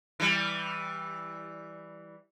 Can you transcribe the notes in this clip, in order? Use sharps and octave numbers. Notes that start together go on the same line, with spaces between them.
E3 G3